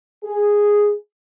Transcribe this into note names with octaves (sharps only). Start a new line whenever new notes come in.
G#4